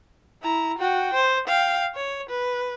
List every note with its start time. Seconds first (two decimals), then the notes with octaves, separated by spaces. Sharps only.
0.42 E4 A#5
0.79 F#4 G5
1.14 C5
1.48 F5 G5
1.95 C#5
2.29 B4